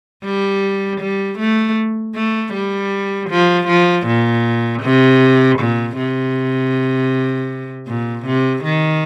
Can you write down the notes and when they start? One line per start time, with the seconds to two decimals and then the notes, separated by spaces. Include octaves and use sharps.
0.24 G3
1.01 G3
1.39 A3
2.15 A3
2.54 G3
3.30 F3
3.68 F3
4.07 A#2
4.83 C3
5.59 A#2
5.97 C3
7.88 A#2
8.26 C3
8.64 D#3